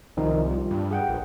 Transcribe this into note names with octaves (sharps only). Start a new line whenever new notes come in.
C2 D#3 F3 D#4
G3 F4
G2
G#4 F#5 G5
A#1